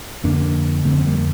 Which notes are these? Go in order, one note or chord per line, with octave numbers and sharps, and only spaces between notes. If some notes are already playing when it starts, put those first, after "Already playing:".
F2 D3 A#3 D4
F2 D3 A3 C4
C4
G3 A#3